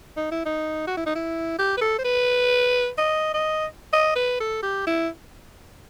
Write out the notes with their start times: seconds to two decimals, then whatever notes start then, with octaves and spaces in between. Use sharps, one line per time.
0.17 D#4
0.31 E4
0.46 D#4
0.87 F#4
0.97 E4
1.06 D#4
1.15 E4
1.58 G4
1.77 B4
1.81 A4
1.99 C5
2.04 B4
2.98 D#5
3.34 D#5
3.93 D#5
4.16 B4
4.40 A4
4.63 G4
4.87 E4